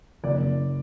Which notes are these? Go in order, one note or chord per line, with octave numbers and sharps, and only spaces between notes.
F#1 D5
F#1